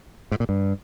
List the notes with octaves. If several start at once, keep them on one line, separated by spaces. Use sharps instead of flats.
G#2
A#2
G2